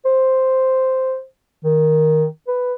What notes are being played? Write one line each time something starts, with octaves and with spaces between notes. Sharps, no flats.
C5
D#3
B4